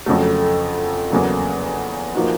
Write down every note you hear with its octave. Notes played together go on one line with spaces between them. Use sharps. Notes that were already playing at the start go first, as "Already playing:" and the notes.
F2 C#3 F#3 A3
E2 C#3 F#3 A#3
F3 A#3 D#4 F#4